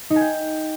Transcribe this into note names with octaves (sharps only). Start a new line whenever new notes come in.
D#4
G#5
G5